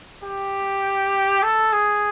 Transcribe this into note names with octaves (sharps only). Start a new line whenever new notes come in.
G4
A4
G#4